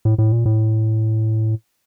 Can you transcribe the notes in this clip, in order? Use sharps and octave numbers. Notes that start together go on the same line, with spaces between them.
A2
A2
A#2
A2